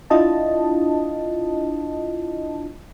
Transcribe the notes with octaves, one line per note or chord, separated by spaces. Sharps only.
D4 E4 F4 D#5 A5